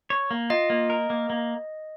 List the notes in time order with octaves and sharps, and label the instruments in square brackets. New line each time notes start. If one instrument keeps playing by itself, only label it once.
[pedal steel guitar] C#5
A#3
[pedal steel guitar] F4 [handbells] D#5
[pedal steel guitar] A#3
A#4
A#3
A#3